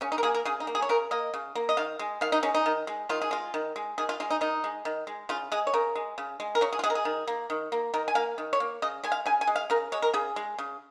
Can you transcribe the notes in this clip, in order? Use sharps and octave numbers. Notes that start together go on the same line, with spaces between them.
C#3 C#4
D#4
A#4
A#3 G#4
A#4
C#3 G#4
D#4
A#3
G#4
C#5
C#3 A#4
A#3 D#5
C#3
A#3
D#5
D#3 F5
G#3
D#3 F5
D#4
G#3 C#4
D#4
D#3
G#3
D#3 F4
G#4
G#3 F4
D#3
G#3
D#3 G#4
F4
G#3 F4
D#4
D#3 D#4
G#3
D#3
G#3
C#3 F4
G#3 G#4
C#5
C#3 A#4
G#3
C#3
G#3
A#4
C#3 C#5
G#4
F4
G#3 G#4
A#4
G#4
D#3
A#3
D#3
A#3
D#3 A#4
G#5
A#3 F5
D#3
C#5
A#3
C#3 D#5
G#3 G#5
F5
C#3 G#5
G#5
G#3
F5
C#3 A#4
G#3 C#5
A#4
C#3 G#4
G#3
C#3